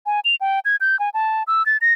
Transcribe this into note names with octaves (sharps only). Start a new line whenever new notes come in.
G#5
F7
G5
G#6
G6
G#5
A5
E6
A6
A#6